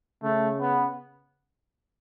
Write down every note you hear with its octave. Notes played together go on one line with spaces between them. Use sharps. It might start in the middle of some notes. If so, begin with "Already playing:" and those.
C#3 A3
B3